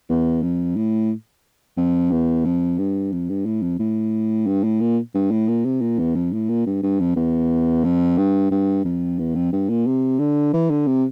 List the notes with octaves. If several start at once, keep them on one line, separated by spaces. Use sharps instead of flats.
E2
F2
A2
F2
E2
F2
G2
F2
G2
A2
F2
A2
G2
A2
A#2
G2
A2
A#2
C3
A#2
E2
F2
A2
A#2
G2
G2
F2
E2
F2
G2
G2
F2
E2
F2
G2
A#2
C3
D3
E3
D3
C3